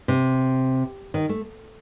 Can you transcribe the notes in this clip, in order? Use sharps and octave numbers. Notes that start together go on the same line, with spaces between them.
C3
D#3
A3